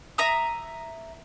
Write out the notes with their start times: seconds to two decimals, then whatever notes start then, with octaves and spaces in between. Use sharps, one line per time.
0.18 E5 A#5 D#6